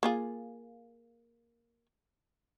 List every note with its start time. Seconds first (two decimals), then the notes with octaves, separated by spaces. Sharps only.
0.03 A#3 F4 G#4